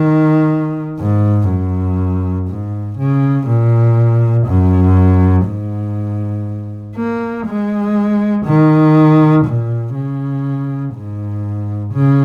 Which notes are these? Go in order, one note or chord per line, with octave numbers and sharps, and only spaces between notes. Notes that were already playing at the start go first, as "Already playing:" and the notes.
Already playing: D#3
G#2
F#2
G#2
C#3
A#2
F#2
G#2
A#3
G#3
D#3
A#2
C#3
G#2
C#3